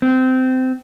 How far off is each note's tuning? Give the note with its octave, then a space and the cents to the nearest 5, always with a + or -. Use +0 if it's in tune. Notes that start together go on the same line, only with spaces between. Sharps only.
C4 -20